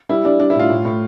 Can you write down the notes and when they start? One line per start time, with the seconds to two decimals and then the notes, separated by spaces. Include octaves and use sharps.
0.09 G3 E4
0.24 G3 D4
0.40 G3 D4
0.50 E4
0.55 A2 F4
0.70 A2
0.85 A2